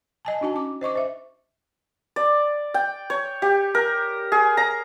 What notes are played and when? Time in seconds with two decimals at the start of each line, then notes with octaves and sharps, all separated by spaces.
0.25 D#5 G#5 A5
0.41 D4 D#4 F#4 G#5 A5
0.54 C#4 D6
0.81 C5 D#5 C#6 D6
0.95 C5 E5
2.16 D5
2.74 G5
3.10 C#5
3.42 G4
3.75 A#4
4.32 G#4
4.57 A#5